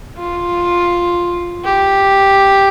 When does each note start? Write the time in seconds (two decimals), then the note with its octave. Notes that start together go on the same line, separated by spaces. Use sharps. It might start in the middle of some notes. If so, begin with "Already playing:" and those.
0.18 F4
1.64 G4